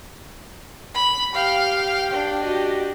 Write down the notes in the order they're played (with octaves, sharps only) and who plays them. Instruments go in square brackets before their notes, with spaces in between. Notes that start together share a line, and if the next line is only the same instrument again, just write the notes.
[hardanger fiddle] B5
[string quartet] G4 G5 [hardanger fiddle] F5
[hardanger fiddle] D4
[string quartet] F#4 G4 D#5